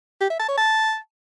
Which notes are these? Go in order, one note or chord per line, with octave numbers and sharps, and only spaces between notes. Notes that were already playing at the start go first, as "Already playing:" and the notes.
G4
E5
A5
C#5
A5